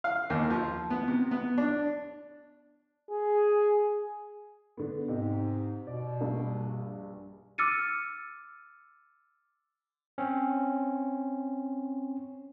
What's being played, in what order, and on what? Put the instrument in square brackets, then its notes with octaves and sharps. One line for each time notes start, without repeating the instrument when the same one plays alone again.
[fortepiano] F5
D#2
F3
B3
C3
B3
D4
[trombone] G#4
[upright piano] D3 B3
[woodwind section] G#2 [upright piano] C3 D#4 G4
[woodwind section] B2 [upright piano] D5
[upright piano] A#1 G2
[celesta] D6 E6 F6 A6 C#7 D#7
[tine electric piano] C4 C#4